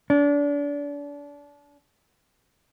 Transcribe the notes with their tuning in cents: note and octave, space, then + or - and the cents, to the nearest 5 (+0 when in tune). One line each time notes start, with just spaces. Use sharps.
D4 -30